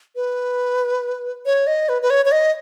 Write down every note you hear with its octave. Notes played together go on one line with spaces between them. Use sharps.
B4
C#5
D#5
B4
B4
C#5
C#5
D#5